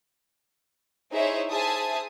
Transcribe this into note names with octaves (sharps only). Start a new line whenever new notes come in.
D#4 E4 G#4 C5 C#5 E5
G#4 C5 E5 G#5 A5 D#6